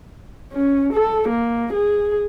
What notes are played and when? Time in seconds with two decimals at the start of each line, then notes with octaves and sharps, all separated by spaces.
0.53 C#4
0.93 A4
1.29 A#3
1.73 G#4